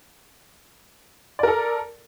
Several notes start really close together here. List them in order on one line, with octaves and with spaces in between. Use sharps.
D5 A#4 A4